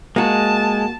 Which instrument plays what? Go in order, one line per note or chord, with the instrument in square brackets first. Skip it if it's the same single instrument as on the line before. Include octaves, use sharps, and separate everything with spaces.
[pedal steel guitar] G#3 [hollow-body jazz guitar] A#3 F#4 [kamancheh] A5